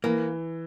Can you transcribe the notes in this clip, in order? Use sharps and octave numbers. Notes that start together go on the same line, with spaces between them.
E3 A#3